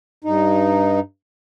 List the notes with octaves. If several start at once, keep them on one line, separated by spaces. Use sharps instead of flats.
G2 D#4